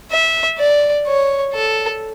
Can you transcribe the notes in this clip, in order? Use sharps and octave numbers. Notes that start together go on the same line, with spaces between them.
E5
D5
C#5
A4